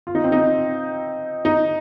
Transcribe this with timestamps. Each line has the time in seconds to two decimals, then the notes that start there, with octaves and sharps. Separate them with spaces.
0.07 F4
0.15 D#4
0.24 C4
0.32 D#4
1.45 D#4